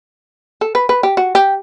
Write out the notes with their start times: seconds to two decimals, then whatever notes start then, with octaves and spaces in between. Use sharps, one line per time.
0.61 A4
0.75 B4
0.89 B4
1.03 G4
1.17 F#4
1.35 G4